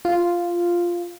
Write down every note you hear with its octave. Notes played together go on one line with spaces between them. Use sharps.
F4